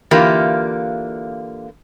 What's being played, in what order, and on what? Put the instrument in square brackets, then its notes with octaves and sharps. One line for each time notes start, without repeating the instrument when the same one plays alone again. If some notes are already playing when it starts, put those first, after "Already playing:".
[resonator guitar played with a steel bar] D3 E3 A#3 F4 G4